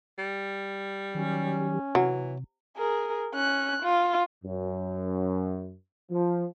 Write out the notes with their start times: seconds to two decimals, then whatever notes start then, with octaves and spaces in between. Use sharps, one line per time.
0.18 G3
1.15 D#3 F#3 C#4 G4
1.95 C3 E3 F#3
2.78 G#4 A#4
3.35 C#4 F#6
3.83 F4
4.44 F#2
6.11 F3